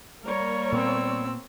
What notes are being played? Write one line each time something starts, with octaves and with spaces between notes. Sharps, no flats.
G3 A#3 A#4 C#5
A#2 B3 C4 E6